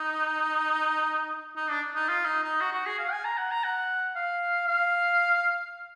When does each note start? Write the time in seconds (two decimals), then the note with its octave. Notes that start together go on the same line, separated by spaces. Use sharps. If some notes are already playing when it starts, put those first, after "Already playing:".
Already playing: D#4
1.56 D#4
1.69 D4
1.95 D#4
2.08 F4
2.25 D#4
2.43 D#4
2.60 F#4
2.73 F#4
2.86 G#4
2.99 F5
3.12 G#5
3.25 A#5
3.38 F#5
3.51 A#5
3.64 F#5
4.15 F5
4.67 F5